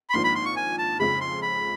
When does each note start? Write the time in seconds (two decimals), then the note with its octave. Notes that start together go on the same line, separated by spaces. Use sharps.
0.10 B5
0.13 G#1 G#2 F3 A#3 D4 C6
0.24 B5
0.35 C6
0.45 C#6
0.56 G#5
0.78 A5
1.00 F2 C#3 F3 G#3 B5
1.21 C6
1.42 B5